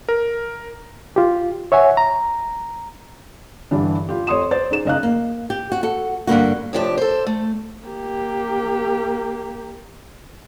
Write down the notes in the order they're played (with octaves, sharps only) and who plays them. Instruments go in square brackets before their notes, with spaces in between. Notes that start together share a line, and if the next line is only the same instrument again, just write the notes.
[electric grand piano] A#4
[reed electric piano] F4 G4
C#5 E5 F#5 G#5
A#5
[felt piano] G2 D3 E3 D4
F4 G4
F2 C#5 D5 C6 D#6 E7
C5 D5 A6
D#4 G#4 E7
F#1 D#4 D#5 F5 A#5 F#6
[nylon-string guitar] A#3
G4
F#4
F#4 A4
G2 D3 A#3 F#4
[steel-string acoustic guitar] A2 C3 F3 D4 G4
A4 C5
A3
[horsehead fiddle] A#3 G4